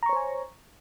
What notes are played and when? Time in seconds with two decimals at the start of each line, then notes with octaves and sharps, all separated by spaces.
0.03 A#5
0.06 C#6
0.09 C#5
0.13 C5
0.16 G#5